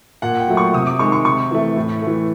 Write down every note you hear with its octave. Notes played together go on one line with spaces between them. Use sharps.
A#2 F#5
G5
F#3 A3
C#6
C3 D#6
D6
D#3 G#3 C#6
C#6
C3 C#6
E3 A3
A2
E3 A3